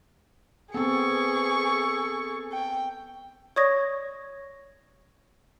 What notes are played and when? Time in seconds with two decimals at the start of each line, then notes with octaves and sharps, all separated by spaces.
0.74 B3 C4 G#4 A4 C#6
2.52 G5
3.56 C#5 D5 C#6 D#6 G#6 A#6